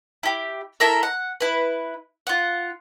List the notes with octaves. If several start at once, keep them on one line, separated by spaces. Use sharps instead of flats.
E4 G4
E4 A4 A#4 E5
F#5
E4 B4
F4 F#5